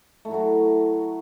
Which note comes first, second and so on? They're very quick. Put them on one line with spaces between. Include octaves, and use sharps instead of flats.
A3 E4 F#3 F#4